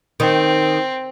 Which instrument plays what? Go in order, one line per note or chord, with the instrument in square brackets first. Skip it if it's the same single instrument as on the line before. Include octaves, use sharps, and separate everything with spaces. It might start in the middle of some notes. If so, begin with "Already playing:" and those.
[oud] D#3 [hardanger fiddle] C4